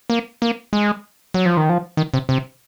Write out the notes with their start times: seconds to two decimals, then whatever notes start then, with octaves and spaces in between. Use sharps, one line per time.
0.10 A#3
0.42 A#3
0.73 G#3
1.34 F#3
1.46 F3
1.57 D#3
1.69 F3
1.97 D#3
2.14 C3
2.29 C3